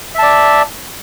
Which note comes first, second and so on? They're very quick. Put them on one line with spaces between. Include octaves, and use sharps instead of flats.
E5 A5 D5